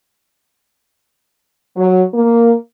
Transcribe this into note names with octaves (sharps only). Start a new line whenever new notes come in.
F#3
A#3